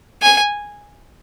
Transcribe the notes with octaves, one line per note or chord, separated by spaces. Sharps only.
G#5